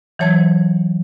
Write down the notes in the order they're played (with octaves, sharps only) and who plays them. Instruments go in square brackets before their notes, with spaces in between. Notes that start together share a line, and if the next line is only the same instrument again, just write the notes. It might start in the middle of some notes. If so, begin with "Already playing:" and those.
[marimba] E3 F#3 C#5 A5 G#6